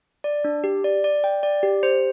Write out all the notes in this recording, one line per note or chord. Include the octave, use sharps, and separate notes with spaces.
D5
D4
G4
D5
D5
G5
D5
G4
C5